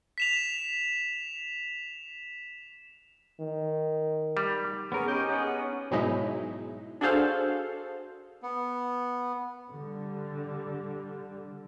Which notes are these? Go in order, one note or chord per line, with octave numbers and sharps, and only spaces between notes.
B6 E7 F7
D#3
G3
B3 C#4 G#4 A#4
C#4 D#4 G4 G#4
B3 C#4
G#2 B2 F#3 G#3 D#4 E4
D4 F#4 G#4 A4 C5 F5
B3
D3 G3